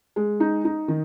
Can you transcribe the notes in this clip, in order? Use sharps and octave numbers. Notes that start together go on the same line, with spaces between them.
G#3
D#4
D#4
D#3